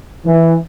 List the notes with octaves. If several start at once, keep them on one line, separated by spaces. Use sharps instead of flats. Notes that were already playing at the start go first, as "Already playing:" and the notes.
E3